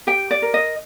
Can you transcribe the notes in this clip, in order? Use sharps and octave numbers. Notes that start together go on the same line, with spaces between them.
G4 G5
D5
A#4
D#5